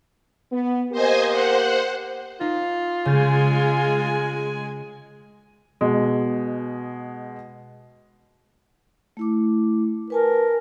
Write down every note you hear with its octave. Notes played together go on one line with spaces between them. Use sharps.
B3
A#3 G4 A#4 C5 D#5 G#5
C5 F#5
D#4 F4
C#3 G#3 G#5 G6 A6
B2 G#3
A3 E4 D6
A#4 B4 G#5 A5